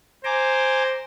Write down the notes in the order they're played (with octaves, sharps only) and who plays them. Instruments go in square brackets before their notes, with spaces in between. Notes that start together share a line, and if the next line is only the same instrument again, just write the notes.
[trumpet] C5 [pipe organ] G#5 A#5 D6